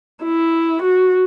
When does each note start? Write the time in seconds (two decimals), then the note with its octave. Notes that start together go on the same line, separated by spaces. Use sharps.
0.24 E4
0.82 F#4